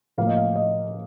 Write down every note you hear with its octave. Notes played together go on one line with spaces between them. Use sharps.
A2 F3 A#3 F5
D#5
F5
D#5